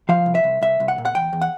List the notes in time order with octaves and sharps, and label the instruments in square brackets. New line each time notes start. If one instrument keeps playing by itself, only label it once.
[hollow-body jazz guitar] F3 F5
C2
E5
C2
C2 E5
C2
F#5
A#2
F#5
E2 G5
E2
F#5